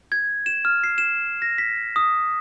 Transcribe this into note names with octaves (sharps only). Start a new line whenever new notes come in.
G#6
E7
F6
C7
E7
A#6
B6
D#6